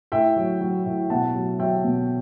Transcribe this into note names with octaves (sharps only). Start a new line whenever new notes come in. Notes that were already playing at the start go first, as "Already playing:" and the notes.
A2 E5 G5
F#3
F#3
A2
B2 F#5 A5
F#3
F#3 E5 G5
B2